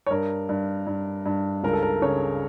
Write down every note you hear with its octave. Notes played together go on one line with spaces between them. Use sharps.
C#5
G2 A#4
G2
G2
G2
C#2 A#4
A4
A#4
C#3 C#5